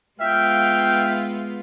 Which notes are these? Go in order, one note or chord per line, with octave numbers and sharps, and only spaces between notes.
G#3 B3 F4 E5 F5 G5